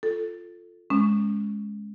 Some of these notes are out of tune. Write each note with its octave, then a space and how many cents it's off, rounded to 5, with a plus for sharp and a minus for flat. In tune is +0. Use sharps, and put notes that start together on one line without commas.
F4 +0 A4 +0
G#3 +5 C#4 +0 D#6 -35